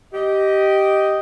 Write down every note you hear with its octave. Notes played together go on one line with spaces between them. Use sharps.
G4 D#5